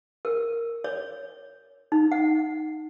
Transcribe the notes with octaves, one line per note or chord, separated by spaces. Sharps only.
A#4
C#5
D#4
F#5